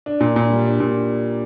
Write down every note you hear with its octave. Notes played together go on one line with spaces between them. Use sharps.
D4
A#2
A#2
G3
D4
A#2